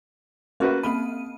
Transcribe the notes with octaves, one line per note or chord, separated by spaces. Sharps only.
A#3 C#4 F#4 B4 E5
A#3 C4 B5 D#7